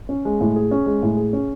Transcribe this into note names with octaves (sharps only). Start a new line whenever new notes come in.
C#4
G#3
A2
G#4
C#4
G#3
A2
G#4
C#4